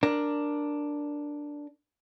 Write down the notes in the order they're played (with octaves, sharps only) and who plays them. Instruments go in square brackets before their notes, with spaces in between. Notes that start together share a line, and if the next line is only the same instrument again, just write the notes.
[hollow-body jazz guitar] D4 A#4